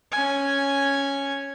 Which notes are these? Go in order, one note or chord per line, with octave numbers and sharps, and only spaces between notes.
C#4 G#5